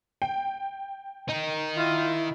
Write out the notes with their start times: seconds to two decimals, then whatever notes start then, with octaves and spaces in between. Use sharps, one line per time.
0.22 G5
1.30 D#3 D#4
1.77 E4 F4